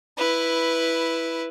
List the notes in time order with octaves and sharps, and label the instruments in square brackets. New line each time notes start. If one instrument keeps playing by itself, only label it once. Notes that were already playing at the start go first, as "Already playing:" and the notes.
[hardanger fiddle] E4 B4